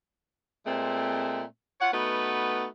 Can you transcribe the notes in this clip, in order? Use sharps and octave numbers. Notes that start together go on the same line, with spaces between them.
A#2 G#3 A3 C4
F4 C#5 F#5
A3 B3 D#4 F#4 B4